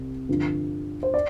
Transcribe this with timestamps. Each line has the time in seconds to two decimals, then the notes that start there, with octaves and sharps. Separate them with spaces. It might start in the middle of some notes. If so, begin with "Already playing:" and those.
Already playing: C2 C3
0.29 G2 D3 F3
1.03 C5
1.14 D5